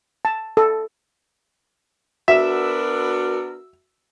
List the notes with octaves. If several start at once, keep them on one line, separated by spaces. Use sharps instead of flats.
A5
A4
B3 D4 F#4 A#4 E5 E6